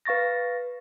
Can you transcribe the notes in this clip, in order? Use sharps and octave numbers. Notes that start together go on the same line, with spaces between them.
B4 F5 C#6 A6 A#6